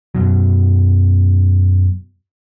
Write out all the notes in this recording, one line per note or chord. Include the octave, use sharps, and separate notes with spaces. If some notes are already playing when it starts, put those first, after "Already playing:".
F#2 B2 F#3